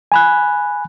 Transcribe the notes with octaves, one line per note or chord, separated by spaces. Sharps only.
G#5 B5 F#6